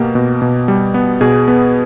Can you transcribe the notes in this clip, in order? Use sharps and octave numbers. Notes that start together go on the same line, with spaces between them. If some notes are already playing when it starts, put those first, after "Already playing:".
Already playing: B2 A#3 G4
B2
B2
G3
B3
B2 G#4
B3